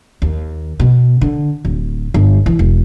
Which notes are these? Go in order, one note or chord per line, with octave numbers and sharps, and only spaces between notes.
D#2
B2
D3
D1
G1
E3
E1